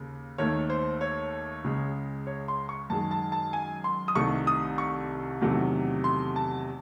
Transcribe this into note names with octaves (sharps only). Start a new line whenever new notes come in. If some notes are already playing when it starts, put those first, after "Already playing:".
Already playing: D#2 C#3
D#2 D#3 A3 C#5
C5
C#5
C#2 C#3 G#3
C#5
C6
C#6
F#2 D#3 G#3 A5
A5
A5
G#5
C6
D#6
C2 C3 D#3 A3 C#6
D#6
C#6
E2 C3 D#3 F#3 A3
C6
A5